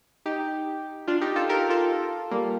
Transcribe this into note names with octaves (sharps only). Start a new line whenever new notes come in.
D#4 G4
D4 F4
D#4 G4
F4 A4
G4 A#4
F4 A4
G3 A#3